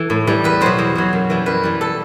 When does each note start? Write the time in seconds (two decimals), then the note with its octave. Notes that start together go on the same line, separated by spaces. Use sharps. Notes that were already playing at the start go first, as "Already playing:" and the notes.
Already playing: E3 A4
0.10 A2
0.27 E3 G3
0.44 E2 B4
0.61 B2 F#3 C5
0.78 E2
0.95 B2 F#3
1.13 F#2
1.30 E3 G3
1.46 F#2 B4
1.63 E3 G3
1.81 A4